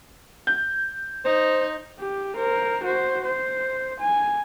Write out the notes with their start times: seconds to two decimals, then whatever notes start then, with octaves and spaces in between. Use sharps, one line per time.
0.47 G6
1.25 D#4 C5
2.00 G4
2.37 A#4 C5
2.84 F#4 C5
3.25 C5
4.00 G#5